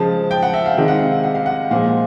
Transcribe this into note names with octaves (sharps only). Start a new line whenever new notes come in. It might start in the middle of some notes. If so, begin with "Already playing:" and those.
Already playing: C#3 F3 G#3 A5
G5
F#5
E5
F5
C3 D#3 G#3 F5
F#5
F5
F#5
F5
F#5
A#2 F3 G#3 F5